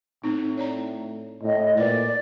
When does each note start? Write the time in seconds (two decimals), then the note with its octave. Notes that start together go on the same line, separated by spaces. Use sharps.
0.24 A2 C4 D#4
0.57 C#5 D5 A#5
1.42 A2 D#5
1.77 A#2 B4 C5 D5